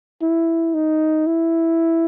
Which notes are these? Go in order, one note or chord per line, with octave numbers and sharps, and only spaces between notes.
E4
D#4
E4